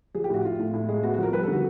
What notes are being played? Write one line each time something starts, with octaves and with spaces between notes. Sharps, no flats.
F3 G#4
G4
A2 F#4
A2 F4
A2
A2
G#3
B3 F#4
F#4
F3 A#4
G3 B4
A4
D3 F#4